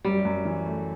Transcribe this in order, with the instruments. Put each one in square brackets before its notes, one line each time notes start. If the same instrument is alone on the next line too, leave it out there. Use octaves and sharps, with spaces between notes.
[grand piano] F#2 [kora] G3
[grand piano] F#2
E3
A3